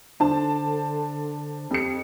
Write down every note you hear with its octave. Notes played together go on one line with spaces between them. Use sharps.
D3 D4 C5 A5
F2 G4 C#7